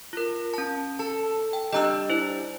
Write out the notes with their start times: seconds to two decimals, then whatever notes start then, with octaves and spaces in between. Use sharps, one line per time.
0.13 F4 A#4
0.54 C#4 A5
0.99 A4 A5
1.53 G5
1.73 G3 D4 D#5 A#5 E6
2.10 E4 C5